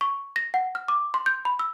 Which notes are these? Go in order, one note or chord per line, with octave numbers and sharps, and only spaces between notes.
C#6
A#6
F#5
F6
D6
C6
G6
B5
E6